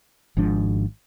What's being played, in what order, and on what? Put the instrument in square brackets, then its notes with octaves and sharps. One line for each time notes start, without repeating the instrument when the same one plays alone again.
[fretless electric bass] G#1 G#2 F3 D4